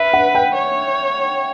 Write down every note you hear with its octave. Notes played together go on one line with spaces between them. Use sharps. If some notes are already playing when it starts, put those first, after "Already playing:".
Already playing: B4 E5
F#5
G5
C#5